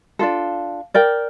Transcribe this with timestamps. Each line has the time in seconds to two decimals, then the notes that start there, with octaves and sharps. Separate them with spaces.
0.19 D4 F4 A4
0.94 A#4 D5 G5